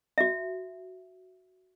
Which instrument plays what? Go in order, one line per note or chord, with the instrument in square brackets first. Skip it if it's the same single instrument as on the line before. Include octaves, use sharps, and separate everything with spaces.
[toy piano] F#4 E5